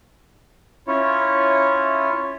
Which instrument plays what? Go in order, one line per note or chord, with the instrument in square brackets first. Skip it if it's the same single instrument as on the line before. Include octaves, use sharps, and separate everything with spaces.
[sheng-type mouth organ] C#4 E4 F4 C#5